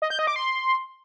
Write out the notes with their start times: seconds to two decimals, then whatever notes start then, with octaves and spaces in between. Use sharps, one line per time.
0.02 D#5
0.10 G6
0.19 D#5
0.27 D6
0.36 C6